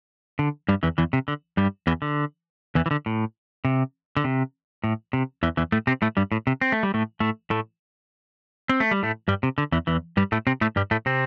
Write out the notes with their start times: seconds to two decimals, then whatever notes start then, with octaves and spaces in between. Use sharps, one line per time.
0.39 D3
0.68 G2 G3
0.83 E2 E3
0.98 E2 E3
1.13 C3
1.28 D3
1.57 G2 G3
1.87 E2 E3
2.02 D3
2.75 E2 E3
2.86 E3
2.91 D3
3.06 A2
3.65 C3
4.17 D3
4.24 C3
4.84 A2
5.13 C3
5.43 E2 E3
5.57 E2 E3
5.72 A2 A3
5.87 C3 C4
6.02 A2 A3
6.17 G2 G3
6.32 A2
6.47 C3
6.61 C4
6.72 A3
6.83 G3
6.94 A2 A3
7.20 A2 A3
7.50 A2 A3
8.69 C4
8.80 A3
8.91 G3
9.03 A2 A3
9.28 G2 G3
9.43 C3
9.58 D3
9.72 E2 E3
9.87 E2 E3
10.17 G2 G3
10.32 A2 A3
10.47 C3 C4
10.61 A2 A3
10.76 G2 G3
10.91 A2 A3
11.06 C3 C4